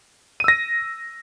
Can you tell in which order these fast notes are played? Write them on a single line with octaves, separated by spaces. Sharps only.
D#7 E6 A#6